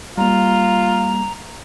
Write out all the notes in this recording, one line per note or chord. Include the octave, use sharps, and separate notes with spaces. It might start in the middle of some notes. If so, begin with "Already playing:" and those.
G3 A#3 F4 A#5